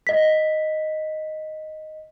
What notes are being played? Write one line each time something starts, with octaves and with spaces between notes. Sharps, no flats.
D#5 B6